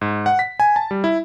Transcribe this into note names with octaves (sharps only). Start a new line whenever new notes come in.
G#2
F#5
B6
G#5
A5
G3
E4